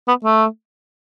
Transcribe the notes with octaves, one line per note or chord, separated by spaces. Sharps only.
B3
A3